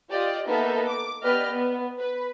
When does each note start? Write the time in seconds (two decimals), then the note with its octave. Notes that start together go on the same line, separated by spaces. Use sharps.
0.11 F4 G4 D5 D#5
0.48 A#3 B3 D#4 A4 A#4 E5
0.87 D6
1.23 B3 G4 B4 D5 D#5 F6
1.53 B3
1.99 B4